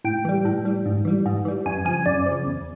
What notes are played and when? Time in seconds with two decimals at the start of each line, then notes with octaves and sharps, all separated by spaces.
0.04 A2 G5
0.25 E3 G3
0.45 A2
0.65 E3 G3
0.86 G#2
1.05 E3 G3
1.26 G#2
1.45 E3 G3
1.66 F#2 G#5
1.85 C#3 F3 G#5
2.06 F#2 D5
2.26 C#3 F3
2.46 E2